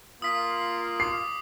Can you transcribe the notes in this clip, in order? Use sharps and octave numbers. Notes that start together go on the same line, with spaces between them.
A#3 F4 D#6 B6
D6 C7